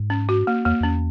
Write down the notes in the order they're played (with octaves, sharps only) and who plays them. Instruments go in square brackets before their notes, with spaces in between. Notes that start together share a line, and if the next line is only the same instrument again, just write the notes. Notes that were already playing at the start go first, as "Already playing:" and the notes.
Already playing: [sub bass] G#2
[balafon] C#4
F#4
A#3
[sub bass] E2 [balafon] A#3
[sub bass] E2 [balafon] C#4